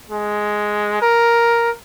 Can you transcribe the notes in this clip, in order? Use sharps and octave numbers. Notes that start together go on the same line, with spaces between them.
G#3
A#4